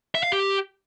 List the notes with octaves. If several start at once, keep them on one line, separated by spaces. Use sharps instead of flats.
E5
F5
G4